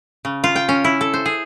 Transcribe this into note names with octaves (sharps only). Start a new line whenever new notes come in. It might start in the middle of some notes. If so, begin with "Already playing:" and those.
C#3
F4
G5
C#4
E4
A4
C5
G#4